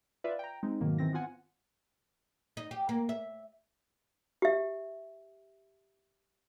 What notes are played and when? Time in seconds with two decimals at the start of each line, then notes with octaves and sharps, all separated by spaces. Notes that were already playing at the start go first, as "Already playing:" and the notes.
0.24 F4 B4 D5 E5 F5
0.39 G5 A#5
0.63 G#3 C4 D#4
0.81 G#2 B2 D#3 F#3 A#3
0.98 D#3 E3 C4 A#6
1.13 B3 C4 F4 F#5 G#5
2.57 D#4
2.71 G4
2.89 A#3
3.09 E5
4.42 G4 E5